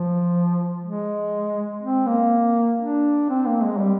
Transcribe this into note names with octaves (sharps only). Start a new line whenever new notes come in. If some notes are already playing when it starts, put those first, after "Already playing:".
Already playing: F3
G#3
C4
A#3
D4
C4
A#3
G#3
G3